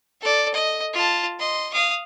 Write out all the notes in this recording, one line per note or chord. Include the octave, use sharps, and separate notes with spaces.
A4 D5
D#5
F4 A5
D#5 C6
F5 D#6